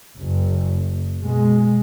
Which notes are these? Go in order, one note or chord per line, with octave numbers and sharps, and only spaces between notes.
F#1
B2 G#3